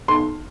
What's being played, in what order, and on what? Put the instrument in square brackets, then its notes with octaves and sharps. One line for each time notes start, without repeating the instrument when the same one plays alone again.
[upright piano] B1 C6